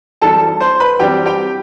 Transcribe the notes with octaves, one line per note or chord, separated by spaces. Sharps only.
F#2 E3 G3 C4 A4 A5
C5 C6
B4 B5
F#2 E3 G3 C4 G4 G5
G4 G5